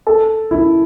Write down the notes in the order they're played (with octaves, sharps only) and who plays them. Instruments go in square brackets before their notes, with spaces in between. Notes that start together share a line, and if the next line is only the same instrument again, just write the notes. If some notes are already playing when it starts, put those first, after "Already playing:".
[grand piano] A4
E4